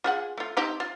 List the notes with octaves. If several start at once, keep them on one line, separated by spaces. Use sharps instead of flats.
F4 G#4 F#5
A3 F4
C4 D#4 G4
F4